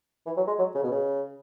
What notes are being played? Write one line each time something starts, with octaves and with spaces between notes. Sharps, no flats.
E3
F#3
G#3
F#3
C#3
B2
C#3